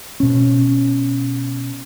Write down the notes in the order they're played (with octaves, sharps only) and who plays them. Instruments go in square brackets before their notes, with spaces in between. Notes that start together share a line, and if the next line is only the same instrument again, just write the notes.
[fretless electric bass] B2 C#4